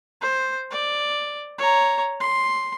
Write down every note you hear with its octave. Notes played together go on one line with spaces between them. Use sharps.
C5
D5
C#5 A#5
C6